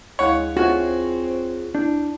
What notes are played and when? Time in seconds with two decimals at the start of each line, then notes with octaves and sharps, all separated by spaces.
0.19 D2 G#3 E4 C#5 F5 F#5
0.57 C4 F4 F#4 G#4 C#5 D5 E5
1.75 D4 E4 G6